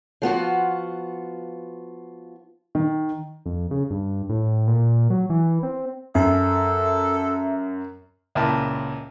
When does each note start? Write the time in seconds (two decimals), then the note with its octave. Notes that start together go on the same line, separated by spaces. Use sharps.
0.22 F3 B3 F4 F#4
2.75 D#3
3.46 F2
3.71 C#3
3.91 G2
4.29 A2
4.68 A#2
5.10 F#3
5.30 E3
5.63 C4
6.15 F#2 A4 E5
8.35 C#2 A#2 E4 G5 A5